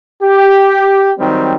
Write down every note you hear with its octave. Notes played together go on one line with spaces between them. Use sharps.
G4
D#3 F#3 G3 C4